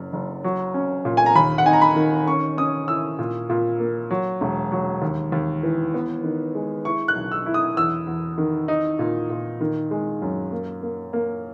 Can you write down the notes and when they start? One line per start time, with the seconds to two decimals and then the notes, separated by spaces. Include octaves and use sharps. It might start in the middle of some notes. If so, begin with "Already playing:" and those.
Already playing: F#1 F#2
0.13 F#1
0.44 F#3
0.74 C#4
1.05 A#2
1.17 G#5
1.26 A#5
1.35 D#2 B5
1.58 F#5
1.66 D#4 G#5
1.73 A#5
1.81 B5
1.96 D#3
2.27 C#4 C#6
2.57 C#4 D#6
2.88 E4 E6
3.19 A#2
3.50 A#2
3.80 A#3
4.10 F#3
4.41 E1
4.72 F#3
5.02 D#2
5.32 D#2
5.63 E3
5.94 B3
6.24 D#3
6.55 G#3
6.85 E4 C#6
7.08 F#6
7.16 B1
7.32 E6
7.46 E4
7.54 D#6
7.77 E2 E6
8.07 E2
8.38 D#3
8.68 D#4
8.99 A#2
9.30 A#2
9.61 D#3
9.91 G#3
10.22 F#2
10.52 A#3
10.83 A#3
11.13 A#3